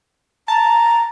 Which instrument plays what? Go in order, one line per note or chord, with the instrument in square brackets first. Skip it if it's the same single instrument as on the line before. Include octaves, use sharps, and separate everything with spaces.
[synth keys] A5 [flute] A#5